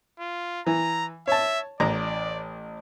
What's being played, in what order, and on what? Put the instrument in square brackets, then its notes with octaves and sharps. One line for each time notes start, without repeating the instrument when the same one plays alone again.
[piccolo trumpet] F4
[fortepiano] E3 [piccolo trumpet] A#5
[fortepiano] C#5 A5 [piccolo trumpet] E5
[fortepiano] A1 A#5 [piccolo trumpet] D5